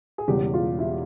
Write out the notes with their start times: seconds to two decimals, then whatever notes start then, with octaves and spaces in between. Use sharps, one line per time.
0.18 G#4
0.28 E1 E2 C#3 G3 G4
0.54 F4
0.79 E4